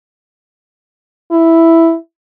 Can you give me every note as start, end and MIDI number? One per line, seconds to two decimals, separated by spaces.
1.32 1.96 64